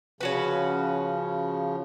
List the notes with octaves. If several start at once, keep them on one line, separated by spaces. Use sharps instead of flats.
C#3 F3 C#4 F#4 B4